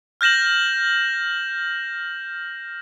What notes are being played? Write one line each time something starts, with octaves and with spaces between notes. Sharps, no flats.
F6 G6 A#6 E7 F#7